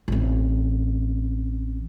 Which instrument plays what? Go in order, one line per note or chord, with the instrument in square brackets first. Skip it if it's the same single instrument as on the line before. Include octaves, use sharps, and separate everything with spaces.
[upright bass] A1 C4